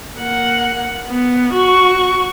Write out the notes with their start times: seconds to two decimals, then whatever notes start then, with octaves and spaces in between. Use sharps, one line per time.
0.17 A#3 F#5
1.08 B3
1.54 F#4 C#6